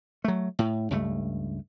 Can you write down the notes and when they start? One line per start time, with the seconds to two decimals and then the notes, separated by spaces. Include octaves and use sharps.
0.24 F#3 A3
0.59 A2
0.91 C#2 G2 A3